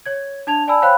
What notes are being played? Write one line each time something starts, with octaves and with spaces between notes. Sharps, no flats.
C#5 G#6
D4 A5 G#6 F7
D5 G#5 A5 B5 E6
C5 C#5 F5 G5 B5 F#6